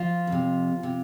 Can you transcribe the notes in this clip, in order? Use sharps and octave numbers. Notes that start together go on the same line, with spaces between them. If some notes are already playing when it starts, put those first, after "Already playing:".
Already playing: F3 F4
F2 C3
C3